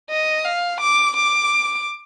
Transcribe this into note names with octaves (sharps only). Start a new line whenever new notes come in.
D#5
F5
D6
D6